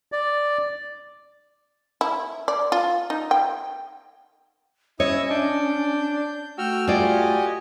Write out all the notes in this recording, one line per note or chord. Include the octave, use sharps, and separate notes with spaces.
D5
E4
D5
F4
D#4
G5
C#4 E4 C#5 D#5 D#6 E6
D4 G6
A3 F#4 G5 E6 F6
F4 G4 D5 D#5 G#5